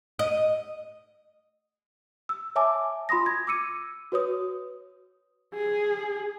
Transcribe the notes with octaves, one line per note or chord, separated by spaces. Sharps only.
D#5
E6
C#5 E5 G#5 A5 D6
F4 B5 C6 D#6 A#6
G#6
D6 E6 C#7 D#7
F#4 B4 C#5 D#6
G#4